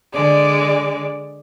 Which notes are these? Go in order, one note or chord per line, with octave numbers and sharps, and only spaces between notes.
D3 G#3 D5